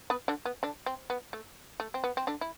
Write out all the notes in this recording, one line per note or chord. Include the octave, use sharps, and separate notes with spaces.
B3 B4
D3 D4
B3
D3 D4
C4
B3
A3
A3
C4
B3
C4
D3 D4
E4